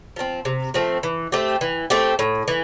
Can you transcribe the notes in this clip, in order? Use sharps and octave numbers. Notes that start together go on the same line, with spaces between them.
F3 A3 C4
C3
F3 A3 C4
E3
A3 C4 G4
E3
A3 C4 G4
A2
E3